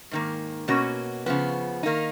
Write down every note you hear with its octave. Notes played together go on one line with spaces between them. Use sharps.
G#2 D#3 A#3
B2 A#3 C#4 F#4
C#3 F3 B3
D#3 A#3 D#4